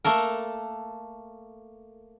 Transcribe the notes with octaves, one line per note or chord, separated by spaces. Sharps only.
A3 A#3 A4 A#4